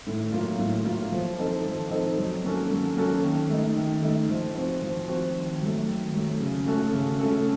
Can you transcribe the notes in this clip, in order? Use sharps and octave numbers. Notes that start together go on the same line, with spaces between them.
A2
F#3 A#3 F4
A2
F#3 A#3 F4
F3
C4 D#4 A4
F3
C4 D#4 A4
F#3
A#3 C#4 F#4 A4
F#3
A#3 C#4 F#4 A4
D#3
A3 D#4
D#3
A3 D#4
F3
C4 F#4
F3
C4 F#4
D#3
F#3 A3
D#3
F#3 A3
C#3
A3 C#4 F#4 A4
C#3
A3 C#4 F#4 A4